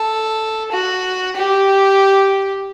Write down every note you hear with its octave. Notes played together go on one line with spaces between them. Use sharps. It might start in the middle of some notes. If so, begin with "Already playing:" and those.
Already playing: A4
F#4
G4